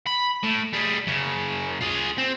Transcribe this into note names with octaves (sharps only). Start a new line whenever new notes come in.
B5
A2
G3 G#4
F#2 C#3
F4 G#4
C4